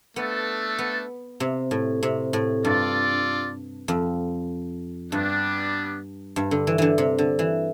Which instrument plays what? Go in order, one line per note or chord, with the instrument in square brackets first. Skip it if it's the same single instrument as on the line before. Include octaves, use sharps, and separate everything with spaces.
[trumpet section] A3 D4 A4 [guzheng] B3
[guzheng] B3
C3
A2
C3
A2
[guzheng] G2 [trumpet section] F4 A4 D5
[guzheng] F2
[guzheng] G2 [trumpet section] G3 B3 D4
[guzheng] G2
D3
E3
D3 E3
C3
D3
E3